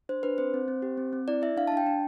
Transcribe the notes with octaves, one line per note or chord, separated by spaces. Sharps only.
D4 C5
D4 B4
C4 C5
C4
C4
G4
C4
C4
E4 D5
E4 E5
D4 F5
A5
D4
G5
D4